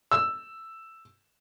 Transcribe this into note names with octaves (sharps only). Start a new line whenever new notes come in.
E6